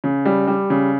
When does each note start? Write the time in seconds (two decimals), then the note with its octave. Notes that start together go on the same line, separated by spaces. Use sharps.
0.04 C#3
0.25 G3
0.47 G3
0.70 C#3